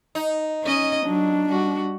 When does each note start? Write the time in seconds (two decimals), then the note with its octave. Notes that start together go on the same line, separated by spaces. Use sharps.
0.15 D#4
0.64 C#4 D#5
1.06 F#3 D4
1.48 G3 F#4